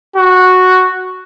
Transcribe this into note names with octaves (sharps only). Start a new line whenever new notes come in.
F#4